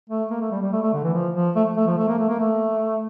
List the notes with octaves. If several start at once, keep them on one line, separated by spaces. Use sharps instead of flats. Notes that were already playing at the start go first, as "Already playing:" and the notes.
A3
A#3
A3
G3
G3
A3
A3
D3
E3
F3
F3
A3
A3
F3
A3
A#3
A3
A#3
A3